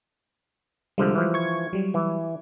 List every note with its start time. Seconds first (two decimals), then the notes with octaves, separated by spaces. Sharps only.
0.98 C2 D3 F3 G3 G#3
1.15 E3 F3
1.34 C#6 G#6
1.73 F#3 G3
1.94 E3